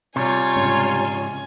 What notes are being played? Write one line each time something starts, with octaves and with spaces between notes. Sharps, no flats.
C3 G3 F4 C#5 G#5
G#2 C#3